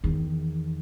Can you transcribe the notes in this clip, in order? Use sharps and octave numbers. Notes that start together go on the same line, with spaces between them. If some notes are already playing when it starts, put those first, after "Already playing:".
E2 D#3